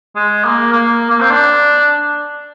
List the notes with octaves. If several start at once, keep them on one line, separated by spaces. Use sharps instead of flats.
G#3
A#3
A#3
A#3
C4
D4